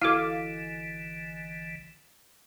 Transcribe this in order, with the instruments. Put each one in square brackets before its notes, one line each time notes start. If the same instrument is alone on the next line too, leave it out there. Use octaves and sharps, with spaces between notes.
[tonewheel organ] G#1 D3 E3 [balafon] E4 F#4 A4 [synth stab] F5 D6